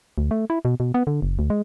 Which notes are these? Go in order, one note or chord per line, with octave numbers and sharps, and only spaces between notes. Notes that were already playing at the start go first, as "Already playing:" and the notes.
D2
A3
E4
B2
B2
B3
D3
F#1
D2
G#3